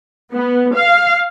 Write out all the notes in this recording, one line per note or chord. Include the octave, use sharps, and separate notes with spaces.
B3
F5